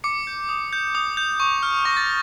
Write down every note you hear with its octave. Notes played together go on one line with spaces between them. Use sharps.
D6 C#7
G6
D#6
G6
D#6
G6
C#6
F6
C#6 A#6
A6